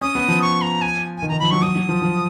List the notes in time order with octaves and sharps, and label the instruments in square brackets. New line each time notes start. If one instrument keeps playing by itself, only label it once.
[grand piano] C#4 [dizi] D#6
[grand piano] B3
F3
[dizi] C#6
A#5
G#5
[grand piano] D#3 [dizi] G#5
[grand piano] D#3 [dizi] A#5
[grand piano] F3 [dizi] B5
[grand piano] F#3 [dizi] C#6
[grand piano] F#3 [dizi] D#6
[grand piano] F#3
F3
F3